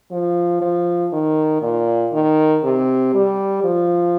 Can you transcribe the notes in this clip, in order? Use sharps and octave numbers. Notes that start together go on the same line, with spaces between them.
F3
F3
D#3
A#2
D#3
C3
G3
F3